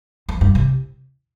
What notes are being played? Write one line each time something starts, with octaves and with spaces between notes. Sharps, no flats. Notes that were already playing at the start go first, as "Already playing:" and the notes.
F2
G2
C3